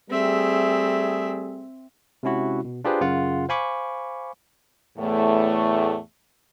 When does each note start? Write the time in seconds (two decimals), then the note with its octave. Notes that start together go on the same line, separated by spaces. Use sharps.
0.10 G3 A3 C4 G#4 E5
2.23 C3 G#3 C#4 E4 F#4
2.65 B2
2.84 D4 F4 G4 G#4 B4 C5
3.01 F#2 C#3 F4 F#5
3.49 C5 F5 G#5 B5 C#6 D6
4.98 E2 A2 A3